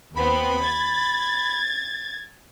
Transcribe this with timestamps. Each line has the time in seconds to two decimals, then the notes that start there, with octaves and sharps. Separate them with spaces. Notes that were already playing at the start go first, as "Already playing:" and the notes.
0.16 D#2 B3 C4 B5
0.64 G#6 A6